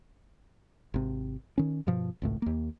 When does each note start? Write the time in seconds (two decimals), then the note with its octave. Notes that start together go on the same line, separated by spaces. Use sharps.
0.94 G#1 C3
1.58 D#3 C#4
1.87 G2 B2 F3
2.22 G#1 C#2 A2
2.42 D#2 A#3